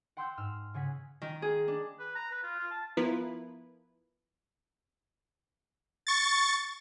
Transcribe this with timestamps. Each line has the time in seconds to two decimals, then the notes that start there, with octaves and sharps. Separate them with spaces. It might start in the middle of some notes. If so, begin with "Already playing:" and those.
0.17 F#5 G5 C6 E6 G6
0.37 G#2 E6 F6 E7
0.74 C#3 G#4 F#5 B6
1.22 D#3
1.42 G#4
1.68 D4
1.99 B4
2.16 A#5
2.31 B4
2.43 F4
2.59 F4
2.71 A5
2.97 F3 B3 E4 F4 A#4 B4
6.07 C#6 A6